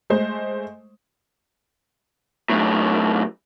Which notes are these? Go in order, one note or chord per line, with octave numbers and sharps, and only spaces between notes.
G#3 A3 C5 D#5
F#2 A2